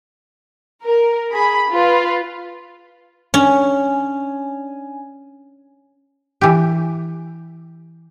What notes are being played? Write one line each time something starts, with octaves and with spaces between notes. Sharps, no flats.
A#4
G#4 B5
F4 B4
C#4 D4 G#5
E3 G4